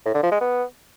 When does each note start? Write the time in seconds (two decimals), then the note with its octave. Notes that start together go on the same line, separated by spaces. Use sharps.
0.05 A2
0.14 D3
0.23 F3
0.32 G#3
0.41 B3